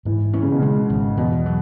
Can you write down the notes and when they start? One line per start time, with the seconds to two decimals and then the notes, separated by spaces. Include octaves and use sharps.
0.05 G#2 E3
0.33 E3 C#4
0.42 C#3
0.51 B2
0.59 C#3 G#3
0.89 G#1
1.17 E2 B2
1.46 F#3